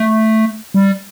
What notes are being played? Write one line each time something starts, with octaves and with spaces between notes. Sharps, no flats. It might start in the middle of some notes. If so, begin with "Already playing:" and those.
Already playing: A3
G3